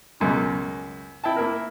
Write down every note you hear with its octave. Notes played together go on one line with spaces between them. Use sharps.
C#2 F#2 B2
E4 G5 A5
A#3 E4 A#4